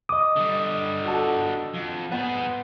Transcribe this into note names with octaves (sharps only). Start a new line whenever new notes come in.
D#5 D6 D#6
D3 G3
F#4 A4
F2
B3 G#4 C5